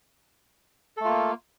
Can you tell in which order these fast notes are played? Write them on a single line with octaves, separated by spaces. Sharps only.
A4 A3 F4 A#3